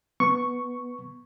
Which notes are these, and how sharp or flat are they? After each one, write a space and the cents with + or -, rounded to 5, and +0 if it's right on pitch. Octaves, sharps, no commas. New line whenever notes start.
B3 +0 C#6 +0